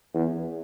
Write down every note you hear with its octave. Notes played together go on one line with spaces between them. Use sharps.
E2